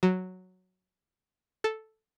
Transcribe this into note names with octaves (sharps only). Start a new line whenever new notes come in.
F#3
A4